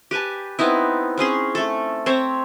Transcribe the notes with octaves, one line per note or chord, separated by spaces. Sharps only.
G4 B4 G#5 A5
B3 C4 D#4 E4
C4 C#4 G#4 C6
A3 A4
C4 C5 C#5 E5